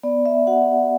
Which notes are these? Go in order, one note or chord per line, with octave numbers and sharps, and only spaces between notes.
B3 D5
E5
F#4 F#5